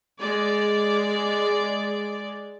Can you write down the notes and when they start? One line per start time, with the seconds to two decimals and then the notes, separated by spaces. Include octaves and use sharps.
0.21 G#3 D5